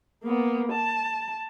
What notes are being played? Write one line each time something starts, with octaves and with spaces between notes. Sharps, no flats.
A#3 B3
A5